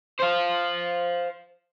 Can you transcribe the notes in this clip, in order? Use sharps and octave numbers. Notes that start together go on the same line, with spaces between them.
C5 F5